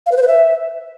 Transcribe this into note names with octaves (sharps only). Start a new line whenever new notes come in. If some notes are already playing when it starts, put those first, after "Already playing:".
F5
B4
C5
B4
E5